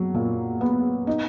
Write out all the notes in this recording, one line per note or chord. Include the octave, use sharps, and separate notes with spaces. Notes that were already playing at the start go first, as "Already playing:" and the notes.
Already playing: F#3
A#2
B3
D#4